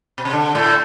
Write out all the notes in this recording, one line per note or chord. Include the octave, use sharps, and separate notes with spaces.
B2
C3
D3
A2 A3